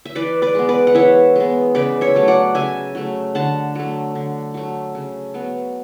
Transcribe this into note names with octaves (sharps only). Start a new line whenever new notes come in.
E5
E3 B4 D5
B4 D5
G#3 B3
B4 D5
F#5
E3 C#5 E5
G#3 B3
C#3 B4 D5
C#5 E5
F#3 A3
D5 F#5
C#3 E5 G#5
F#3 A3
D3 F#5 A5
F#3 A3
D3
F#3 A3
C#3
F#3 B3